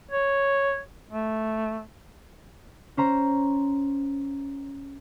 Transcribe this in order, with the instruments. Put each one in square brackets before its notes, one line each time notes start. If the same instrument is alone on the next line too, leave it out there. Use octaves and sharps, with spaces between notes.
[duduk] C#5
A3
[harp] C#4 C5 A#5